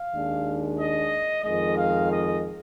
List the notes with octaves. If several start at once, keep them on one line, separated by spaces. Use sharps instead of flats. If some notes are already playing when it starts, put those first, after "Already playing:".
Already playing: F5
D#2 D#3 G#3 D4
D#5
F2 D#3 G#3 D#5
F5
D#5